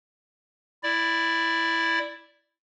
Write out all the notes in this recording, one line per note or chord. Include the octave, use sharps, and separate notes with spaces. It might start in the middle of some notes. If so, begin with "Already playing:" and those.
E4 D5